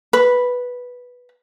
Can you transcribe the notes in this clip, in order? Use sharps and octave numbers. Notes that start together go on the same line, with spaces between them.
B4